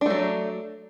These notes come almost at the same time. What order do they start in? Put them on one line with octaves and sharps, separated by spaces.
D4 A3 F#3